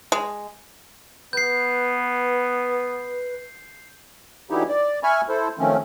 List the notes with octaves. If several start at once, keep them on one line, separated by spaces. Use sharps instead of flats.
G#3
B3 B4 G6 C7
D3 E3 F#3 D#4 E4 G4
D5
E5 G#5 B5 C#6 F6
E4 A4 C5
D#3 F3 A3 C4 C#4